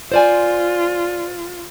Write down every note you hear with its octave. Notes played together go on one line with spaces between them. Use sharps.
F4 C5 D5 G#5